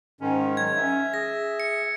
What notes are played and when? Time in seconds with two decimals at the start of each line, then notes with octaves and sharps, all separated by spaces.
0.21 G#2 D#3 C#4
0.57 F#3 G#6
0.76 C#4 E5
1.14 G#4 A#6
1.60 C#7